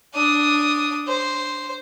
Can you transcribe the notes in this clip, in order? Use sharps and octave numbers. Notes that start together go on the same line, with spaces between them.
D4 D#6
C5